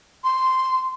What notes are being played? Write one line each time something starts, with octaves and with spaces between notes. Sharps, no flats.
C6